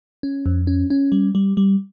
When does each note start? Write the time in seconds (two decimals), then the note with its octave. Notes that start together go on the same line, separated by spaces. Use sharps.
0.23 C#4
0.46 F2
0.67 C#4
0.90 C#4
1.12 G3
1.35 G3
1.57 G3